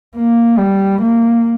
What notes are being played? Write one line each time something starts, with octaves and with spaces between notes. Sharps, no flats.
A#3
G3
A#3